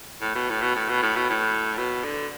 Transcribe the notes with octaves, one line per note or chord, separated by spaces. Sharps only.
A2
B2
A2
B2
A2
B2
A2
B2
A2
B2
D3